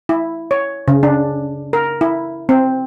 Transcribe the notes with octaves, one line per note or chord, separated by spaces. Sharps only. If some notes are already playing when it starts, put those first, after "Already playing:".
E4
C#5
C#3
D4
A#4
E4
C4